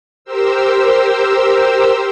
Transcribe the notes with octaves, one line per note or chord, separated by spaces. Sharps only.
G4 A#4 C5 E6